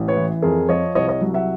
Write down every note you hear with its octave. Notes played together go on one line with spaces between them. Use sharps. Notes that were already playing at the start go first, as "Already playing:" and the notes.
Already playing: A1
B4 C#5
E3
F2 G#4 A#4
F3 C#5 D#5
C2 C#5 D#5
C#5 D#5
F#3
E5 F#5